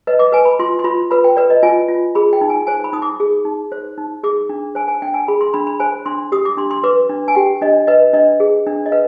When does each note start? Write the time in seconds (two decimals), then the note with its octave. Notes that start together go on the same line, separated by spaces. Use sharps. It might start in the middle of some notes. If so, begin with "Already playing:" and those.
0.07 B4 D#5
0.19 D6
0.32 B4 G#5
0.45 B5
0.59 F4 C6
0.79 C6
0.84 F4 B5
1.11 B4 B5
1.24 G5
1.37 B4 D5
1.50 D#5
1.63 F4 G#5
1.89 F4
2.15 G#4 B5
2.33 G5
2.41 D#4
2.50 G#5
2.67 C5 G#5
2.84 B5
2.93 D#4 D#6
3.02 D6
3.20 G#4
3.45 D#4
3.72 C5
3.98 D#4
4.23 G#4 D6
4.49 D4
4.75 C5 G#5
4.88 G#5
5.02 D4 G5
5.14 G#5
5.28 G#4 B5
5.41 C6
5.54 D4 B5
5.67 B5
5.80 C5 G#5
6.06 D4 C6
6.32 G4 D#6
6.45 D6
6.57 D4 C6
6.71 C6
6.83 B4 D6
7.09 D4
7.28 G#5
7.35 G4 G5
7.62 D4 D#5
7.87 B4 D#5
8.13 D4 D#5
8.40 G#4
8.67 D4
8.86 D#5
8.92 B4 F5